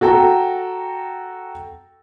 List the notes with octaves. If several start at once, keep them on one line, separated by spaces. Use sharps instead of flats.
F#4 A4 G5 A#5